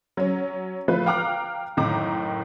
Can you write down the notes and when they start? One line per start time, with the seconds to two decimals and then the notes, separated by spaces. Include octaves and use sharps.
0.17 F#3 C#4
0.88 F3 G#3 A3 F4 B4
1.06 F5 G5 A#5 D6 F6 F#6
1.77 F#1 A2 D#3 A#5 D6